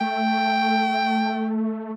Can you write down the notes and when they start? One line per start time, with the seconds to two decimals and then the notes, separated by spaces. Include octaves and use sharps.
0.01 A3 G5